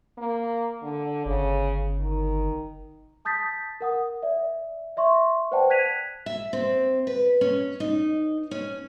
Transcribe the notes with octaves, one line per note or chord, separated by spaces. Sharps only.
A#3
D3
G1 C#3
D#3
A5 D#6 G6 A6 B6
A#4 F#5 D#6
D5 E5
D5 E5 C6 C#6
B4 C5 D5 F#5 G5 A5
F#6 G#6 B6 D#7 F7
E5
C4
B4
C#4
D#4
C#4